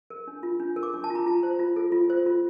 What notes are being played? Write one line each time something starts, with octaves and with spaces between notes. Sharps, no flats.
A#4
D4
F4
D4
A#4
D6
D4
A5
F4
A#5
F4 A5
C5
F4
A4
F4
C5
F4